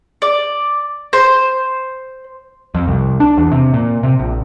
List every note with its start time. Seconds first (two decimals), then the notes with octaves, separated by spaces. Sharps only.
0.22 D5
1.13 C5
2.75 F2
2.88 C2
3.20 D4
3.37 E2
3.52 C3
3.74 A#2
4.03 C3
4.19 A#1